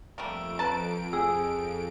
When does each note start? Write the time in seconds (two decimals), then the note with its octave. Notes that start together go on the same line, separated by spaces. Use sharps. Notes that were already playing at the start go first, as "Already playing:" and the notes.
0.18 F2 G3 A3 A#3 D7
0.59 B4 A5 A#5
1.13 G#4 E6